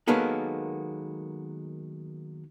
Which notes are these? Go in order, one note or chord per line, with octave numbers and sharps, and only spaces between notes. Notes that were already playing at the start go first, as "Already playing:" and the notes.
D#3 F#3 G#3 A#3 B3 A4